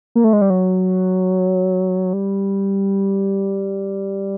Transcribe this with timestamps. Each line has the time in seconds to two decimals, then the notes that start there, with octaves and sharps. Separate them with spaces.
0.15 A#3
0.24 A3
0.33 G#3
0.41 G3
0.50 F#3
2.13 G3